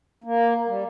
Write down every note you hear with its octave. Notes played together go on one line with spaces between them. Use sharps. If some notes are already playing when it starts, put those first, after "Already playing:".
A#3
G3